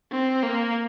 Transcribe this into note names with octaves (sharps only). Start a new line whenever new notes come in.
C4
A#3